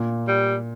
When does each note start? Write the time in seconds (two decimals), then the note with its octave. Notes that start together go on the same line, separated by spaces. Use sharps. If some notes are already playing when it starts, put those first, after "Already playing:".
Already playing: A#2
0.28 G3